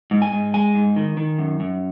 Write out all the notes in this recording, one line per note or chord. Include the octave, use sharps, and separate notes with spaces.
G#2
G#5
G#2
G#3 G#5
G#2
D#3
D#3
F#2
F#2